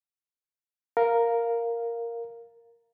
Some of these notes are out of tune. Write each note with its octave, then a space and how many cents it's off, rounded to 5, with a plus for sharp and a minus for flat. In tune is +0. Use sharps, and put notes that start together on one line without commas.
A#4 +0 F5 +0